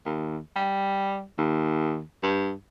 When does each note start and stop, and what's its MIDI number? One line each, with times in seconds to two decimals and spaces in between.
0.06 0.38 39
0.56 1.24 55
1.38 2.02 39
2.23 2.51 43